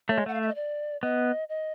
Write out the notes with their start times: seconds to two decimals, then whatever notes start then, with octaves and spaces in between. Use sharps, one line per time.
0.09 A3 C#5
0.18 G#3
0.26 A3 F#5
0.34 F5
0.41 E5
0.48 D#5
0.55 D5
1.02 B3 D#5
1.49 D#5